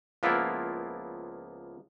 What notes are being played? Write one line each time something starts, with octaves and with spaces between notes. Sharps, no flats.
C#2 F3 A#3 B3 E4 F4